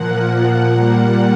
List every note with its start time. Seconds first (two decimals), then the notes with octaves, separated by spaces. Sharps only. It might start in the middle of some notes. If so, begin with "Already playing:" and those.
Already playing: A#2 F3 A#3 F#5
0.71 A#2 G3 A#3